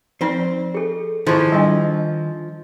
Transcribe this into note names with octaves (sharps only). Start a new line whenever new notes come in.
F3 C4 D#4 C5 D5
G#4 A4
D#3 F3 D#4 E4 G#4 C5 C#6
G3 D4 D#5 E5